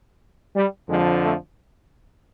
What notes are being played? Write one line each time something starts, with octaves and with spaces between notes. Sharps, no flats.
G3
F2 D3 F3 G#3
A3